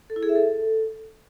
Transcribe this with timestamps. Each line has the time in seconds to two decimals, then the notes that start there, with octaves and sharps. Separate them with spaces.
0.10 A4
0.16 E4
0.23 G#4
0.29 E5
0.35 A4